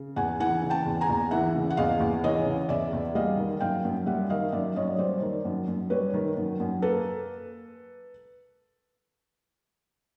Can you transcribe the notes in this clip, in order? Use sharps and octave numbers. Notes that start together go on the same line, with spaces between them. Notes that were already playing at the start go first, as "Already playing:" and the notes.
Already playing: C#3
E2 F#5 G#5
E3 F#5 G#5
C#3
G5 A5
E2
G#5 A#5
E2
E3 E5 F#5
C#3
F#5
E2 D#5 F5
E2
E3 C#5 D#5
C#3
E2 D5 E5
E2
G3 D#5 F5
D#3
F#2 F5 G5
F#2
G3 E5 F#5
D#3 D#5 F5
F#2 D5 E5
F#2 C#5 D#5
G3 C5 D5
D#3
F#2
F#2
G3 B4 C#5
D#3
F#2
F#2
A#3 A4 B4